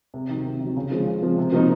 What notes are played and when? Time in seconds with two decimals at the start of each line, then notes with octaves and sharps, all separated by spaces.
0.14 C3
0.29 D#3 F#3
0.46 C3
0.60 D#3 F#3
0.76 C#3
0.91 F3 G#3
1.07 C#3
1.23 F3 G#3
1.38 C3
1.53 F3 A#3 D#4 F#4